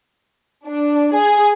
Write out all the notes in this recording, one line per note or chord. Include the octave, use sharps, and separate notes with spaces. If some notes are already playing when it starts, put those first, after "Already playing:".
D4
G#4